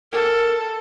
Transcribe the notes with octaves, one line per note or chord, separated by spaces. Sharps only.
A4 A#4